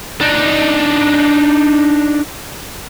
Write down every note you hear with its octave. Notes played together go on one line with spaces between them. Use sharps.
D4 D#4